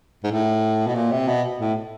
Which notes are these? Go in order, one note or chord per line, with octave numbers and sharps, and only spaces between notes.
G#2
A2
B2
A#2
C3
B2
A2